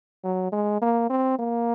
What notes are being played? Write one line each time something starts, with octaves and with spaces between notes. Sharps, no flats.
F#3
G#3
A#3
C4
A#3